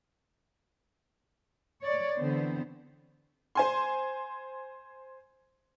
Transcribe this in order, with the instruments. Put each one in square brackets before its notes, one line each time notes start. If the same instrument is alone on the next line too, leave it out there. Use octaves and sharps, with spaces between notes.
[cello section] C#5 D5
D3 E3 B3 C4 C5
[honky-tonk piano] C5 G#5 C6